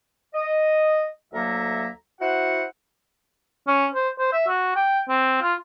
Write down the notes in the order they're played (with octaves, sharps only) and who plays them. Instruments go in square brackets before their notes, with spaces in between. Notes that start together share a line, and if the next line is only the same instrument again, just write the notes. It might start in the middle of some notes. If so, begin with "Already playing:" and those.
[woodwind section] D#5
D2 F#3 A#3 A4 E5 A#5
E4 F#4 C5 F#5
[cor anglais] C#4
C5
C5
E5
F#4
G5
C4
F4